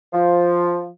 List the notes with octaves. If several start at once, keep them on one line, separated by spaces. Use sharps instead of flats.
F3